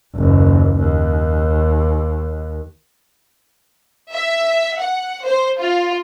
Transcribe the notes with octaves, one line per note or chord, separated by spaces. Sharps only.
F#1 D#2
D#2
E5
F#5
C5
F4